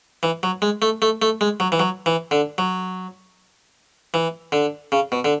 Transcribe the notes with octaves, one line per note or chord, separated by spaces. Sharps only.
E3
F#3
G#3
A3
A3
A3
G#3
F#3
E3
F#3
E3
D3
F#3
E3
D3
C#3
B2
D3